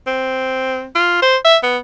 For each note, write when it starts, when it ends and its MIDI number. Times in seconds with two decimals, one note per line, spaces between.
0.07 0.87 60
0.95 1.22 65
1.22 1.37 72
1.45 1.58 76
1.63 1.78 59